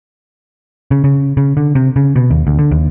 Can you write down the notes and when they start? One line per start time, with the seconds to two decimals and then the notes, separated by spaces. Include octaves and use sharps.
0.91 C#3
1.04 C#3
1.37 C#3
1.57 D3
1.75 C3
1.96 C#3
2.16 B2
2.31 D#2
2.47 D2
2.59 D3
2.71 D#2